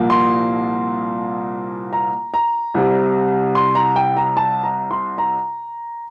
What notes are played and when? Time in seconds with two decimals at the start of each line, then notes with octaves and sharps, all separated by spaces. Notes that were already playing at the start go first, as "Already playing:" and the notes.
Already playing: C2 A#2 F3 A#3
0.10 C6
1.93 A#5
2.34 A#5
2.74 C2 C3 G3
3.55 C6
3.75 A#5
3.96 G5
4.17 A#5
4.37 A5
4.64 A#5
4.91 C6
5.18 A#5